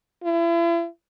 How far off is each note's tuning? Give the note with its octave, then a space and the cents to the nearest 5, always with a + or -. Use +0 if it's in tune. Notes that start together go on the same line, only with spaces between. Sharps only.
E4 +40